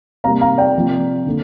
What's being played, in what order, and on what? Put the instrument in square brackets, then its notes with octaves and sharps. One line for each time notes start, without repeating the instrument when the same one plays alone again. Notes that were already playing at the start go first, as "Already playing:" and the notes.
[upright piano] C3 G3 A#3 F5 A#5
F5 A#5
D5 G5
C3 F3 A#3
D3 A#3